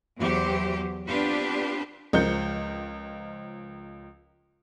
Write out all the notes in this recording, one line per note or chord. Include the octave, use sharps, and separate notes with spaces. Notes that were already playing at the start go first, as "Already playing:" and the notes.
E2 F#3 G4 C5
B3 C4 D4 F4 G4 B4
C#2 F3 A#4 D#5 G6 C#7